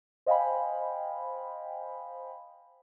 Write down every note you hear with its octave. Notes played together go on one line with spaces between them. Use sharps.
C5 D#5 F5 G5 G#5 B5